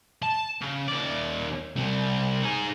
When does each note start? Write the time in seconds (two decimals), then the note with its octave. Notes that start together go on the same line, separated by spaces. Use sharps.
0.22 A5
0.61 C#3
0.88 D#2 D5
1.76 C2 G3
2.42 D#4 G#4